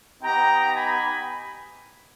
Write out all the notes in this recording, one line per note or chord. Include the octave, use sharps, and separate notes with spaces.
B3 D#4 G4 G5 A#5
G#5 B5